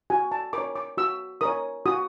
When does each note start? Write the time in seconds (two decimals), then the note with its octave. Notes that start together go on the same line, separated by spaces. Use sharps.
0.10 F#4 G#5
0.32 A5
0.53 A#4 C#5 D6
0.76 D6
0.97 F#4 E6
1.41 A#4 C#5 D#6
1.86 F#4 D#6